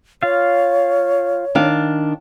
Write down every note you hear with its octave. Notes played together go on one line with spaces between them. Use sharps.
F4 C#5 F5
D#3 D4 F5